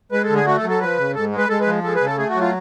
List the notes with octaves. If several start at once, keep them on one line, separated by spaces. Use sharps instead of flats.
G#3 B4
A4
D3
G#4
A3 F#4
A4
F#3
A4
F3 B4
C#3
G#2 A4
G#3
B4
G#3 A4
B4
F3
G#3 A4
B4
C#3
A4
A3 G#4
F#4
F#3
F4